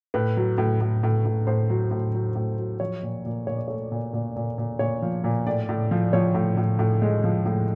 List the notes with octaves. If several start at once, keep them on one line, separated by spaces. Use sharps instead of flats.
A2 B4
F#3
A2
A2
A2
A2
A2 C5
F#3
A2
F#3
A2
F#3
F3 C#5
A#2
A#2
A#2 C#5
D5
A3 C#5
A#2
A#2
A#2
A#2
A#2 C#5
F3
A#2
A2 D5
A2
F3
F3 C#5
A2
A2
A2
G#3
F3
A2